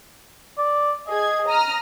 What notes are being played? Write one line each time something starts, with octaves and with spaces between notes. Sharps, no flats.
D5
G#4 D#5 G#6
A#5 D#6 F6